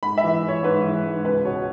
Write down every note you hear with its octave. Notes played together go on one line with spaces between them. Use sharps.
G#2 B5
E5
E3
E3
C#5
G#2 B4
E3
G#2
C#2 B4
B2 C#5